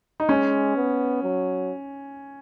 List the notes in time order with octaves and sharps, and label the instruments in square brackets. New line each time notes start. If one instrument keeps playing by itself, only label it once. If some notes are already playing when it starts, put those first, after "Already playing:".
[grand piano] D#4
[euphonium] G#3 [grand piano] C#4
[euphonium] B3
F#3